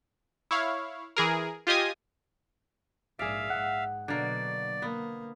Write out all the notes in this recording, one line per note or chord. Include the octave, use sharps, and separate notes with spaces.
E4 C#5 F5
E3 G#4 A#4
F4 G4 D#5 G#5 D#6
A#1 G#2 G#4 D5 E5 F5 E7
G#2 F#5
B2 D3 F#3 A#3 D5
A#3 B3